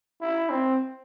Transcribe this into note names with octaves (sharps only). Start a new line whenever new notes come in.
E4
C4